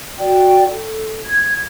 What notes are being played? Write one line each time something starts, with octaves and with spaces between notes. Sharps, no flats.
F#4 D5 G5
A4
G#6